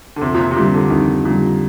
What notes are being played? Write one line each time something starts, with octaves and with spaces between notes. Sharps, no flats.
D3
F2 C3
A#2
C3
C3
A#2 D3 G3
D3
F2 D#3
A#2 D3 G3